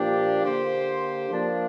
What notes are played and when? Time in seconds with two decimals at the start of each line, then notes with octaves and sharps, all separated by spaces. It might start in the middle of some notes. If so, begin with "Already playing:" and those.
Already playing: A#2 F3 D4 G4
0.43 D3 A#3 G4 C5
1.30 F3 A#3 D4 F4